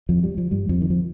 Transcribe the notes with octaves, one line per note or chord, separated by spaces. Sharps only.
F2 F3
G3
F3
G2 G3
F2 F3
D#3
F3